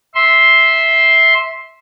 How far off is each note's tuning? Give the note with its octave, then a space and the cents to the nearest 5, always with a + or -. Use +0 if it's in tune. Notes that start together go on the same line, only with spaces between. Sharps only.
E5 -10 C6 +5